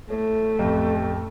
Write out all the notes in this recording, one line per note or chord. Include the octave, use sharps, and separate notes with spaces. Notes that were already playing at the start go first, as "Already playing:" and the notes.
A2 A3
A1 F2 G4